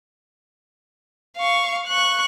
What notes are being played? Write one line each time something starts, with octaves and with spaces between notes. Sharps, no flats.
F5 C#6
C#6 F#6